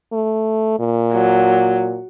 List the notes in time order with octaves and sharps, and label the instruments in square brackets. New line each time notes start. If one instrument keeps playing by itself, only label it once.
[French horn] A3
A#2
[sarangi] F#3